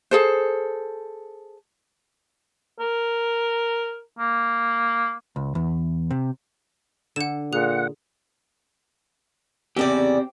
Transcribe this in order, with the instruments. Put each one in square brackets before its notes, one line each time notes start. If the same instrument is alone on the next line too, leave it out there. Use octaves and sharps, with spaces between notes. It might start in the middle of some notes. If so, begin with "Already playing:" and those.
[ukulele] G#4 A4 C5
[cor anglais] A#4
A#3
[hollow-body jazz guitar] C#2
E2
C3
[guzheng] D3 [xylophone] F#5 E7
[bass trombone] A#2 [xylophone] G#4 [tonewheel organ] F#5
[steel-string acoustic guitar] E2 C#3 D5 [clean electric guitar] C4 G4